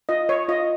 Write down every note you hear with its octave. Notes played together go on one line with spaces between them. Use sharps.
F4 D#5
C#5
F4 D#5